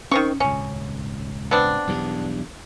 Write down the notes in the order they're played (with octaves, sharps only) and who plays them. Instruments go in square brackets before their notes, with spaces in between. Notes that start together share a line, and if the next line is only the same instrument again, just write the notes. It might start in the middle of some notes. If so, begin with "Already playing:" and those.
[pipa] D#3 C4 C#6 [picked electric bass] C#4
[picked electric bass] D#1 G#1 C#2 [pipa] C#4
[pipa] B3 C4 D4
[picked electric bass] B1 E2 G2